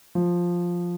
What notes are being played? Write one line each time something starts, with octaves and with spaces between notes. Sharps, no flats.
F3